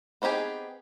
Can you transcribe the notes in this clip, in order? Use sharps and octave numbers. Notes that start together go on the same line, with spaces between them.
B3 C4 D#4 G4 G#4